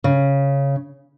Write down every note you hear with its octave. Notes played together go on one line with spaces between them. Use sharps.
C#3